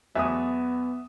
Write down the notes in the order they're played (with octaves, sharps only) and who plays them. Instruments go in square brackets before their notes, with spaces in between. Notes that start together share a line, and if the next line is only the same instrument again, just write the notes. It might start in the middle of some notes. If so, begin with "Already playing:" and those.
[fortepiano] E2 F#3 A3 [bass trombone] B3 [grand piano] E5 D#6